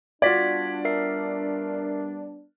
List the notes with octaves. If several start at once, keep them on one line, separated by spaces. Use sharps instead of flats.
G3 B3 D4 F4 F#4 D5 G#6 B6
A#4 E5 C7